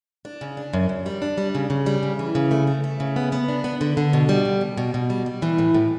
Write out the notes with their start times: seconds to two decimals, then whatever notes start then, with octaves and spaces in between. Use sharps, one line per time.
0.25 D4
0.41 C#3
0.57 D4
0.74 F#2
0.89 F#2
1.06 G3
1.22 D4
1.38 G3
1.55 C#3
1.70 C#3
1.86 G3
2.03 C#3
2.19 E3
2.35 C#3
2.51 A3
2.67 A3
2.84 A3
3.00 C#3
3.16 B3
3.32 B3
3.48 D4
3.64 B3
3.81 D3
3.97 D3
4.13 B2
4.29 G3
4.45 B2
4.61 B2
4.78 B2
4.94 B2
5.10 G3
5.26 G3
5.42 E3
5.58 A2
5.74 A2